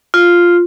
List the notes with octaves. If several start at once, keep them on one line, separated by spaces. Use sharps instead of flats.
F4